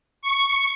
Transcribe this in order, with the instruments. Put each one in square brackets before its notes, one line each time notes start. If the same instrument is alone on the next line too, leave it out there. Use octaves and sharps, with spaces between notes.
[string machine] C#6